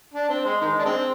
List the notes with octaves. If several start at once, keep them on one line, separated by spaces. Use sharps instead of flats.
D4
C4
G#3
D#3 G#3
D4
G#3 C4